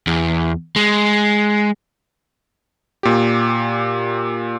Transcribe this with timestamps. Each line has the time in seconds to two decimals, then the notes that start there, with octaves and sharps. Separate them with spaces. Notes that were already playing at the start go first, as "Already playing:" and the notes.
0.07 E2
0.76 G#3
3.03 A#2 G4